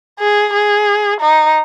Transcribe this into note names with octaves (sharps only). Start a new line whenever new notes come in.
G#4
G#4
D#4